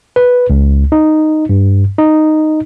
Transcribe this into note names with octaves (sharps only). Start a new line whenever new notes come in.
B4
C#2
D#4
G2
D#4